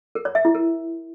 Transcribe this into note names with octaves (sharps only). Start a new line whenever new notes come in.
A#4
C#5
E5
E4
A#4